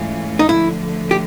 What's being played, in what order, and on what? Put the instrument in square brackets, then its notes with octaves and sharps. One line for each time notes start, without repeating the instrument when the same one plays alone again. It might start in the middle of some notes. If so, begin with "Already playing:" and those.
Already playing: [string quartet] G#2 E3 A3 C#4 F4
[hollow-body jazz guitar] D#4
[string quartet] D3 F3 A3 [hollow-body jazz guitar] E4
[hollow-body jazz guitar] G4